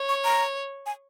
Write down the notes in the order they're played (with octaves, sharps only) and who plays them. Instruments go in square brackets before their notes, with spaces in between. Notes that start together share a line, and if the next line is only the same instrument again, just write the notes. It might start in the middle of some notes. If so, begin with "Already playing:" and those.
Already playing: [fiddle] C#5
[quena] C#6
A#5
G#5